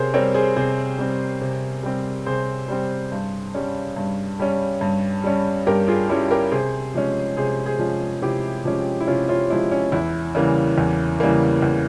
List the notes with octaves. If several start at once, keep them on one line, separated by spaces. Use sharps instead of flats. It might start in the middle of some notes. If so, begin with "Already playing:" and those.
Already playing: C3 G#4 A#4 C5 C#5
G3 C4 A#4 C#5
G#4 C5
C3 G#4 C5
G3 C4
C3
G3 C4
C3 G#4 C5
G3 C4
G2
G3 C#4
G2
G3 C#4
G2
G3 C#4
G2 G4 A#4
F4 G#4
G3 C#4 E4
G4 A#4
C3 G#4 C5
F3 G#3 C#4
C3 G#4 C5
G#4 C5
F3 G#3 C#4
C3 E4 G4
F3 G#3 C#4
E4
C3 C#4 F4
C#4 F4
F3 G#3 C#4 E4
C#4
E2 E4
C#3 E3 G3 A#3
E2
C#3 E3 G3 A#3
E2